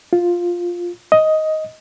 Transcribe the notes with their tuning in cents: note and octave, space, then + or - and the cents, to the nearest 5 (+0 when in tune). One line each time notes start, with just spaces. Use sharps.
F4 +5
D#5 +10